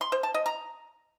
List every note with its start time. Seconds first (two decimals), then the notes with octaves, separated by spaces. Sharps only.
0.01 C6
0.12 C5
0.23 A5
0.34 D#5
0.46 A#5